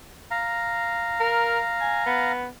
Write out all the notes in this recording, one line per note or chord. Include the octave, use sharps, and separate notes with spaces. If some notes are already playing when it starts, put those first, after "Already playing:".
F5 A#5
A#4
G#5
B3